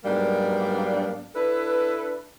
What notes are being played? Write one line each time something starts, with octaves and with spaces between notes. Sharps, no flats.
G#2 F#3 G3 A#3 B3 D4
D4 E4 A4 B4